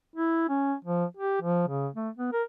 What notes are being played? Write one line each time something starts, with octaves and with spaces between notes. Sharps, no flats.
E4
C#4
F3
G4
F3
C#3
A3
B3
A#4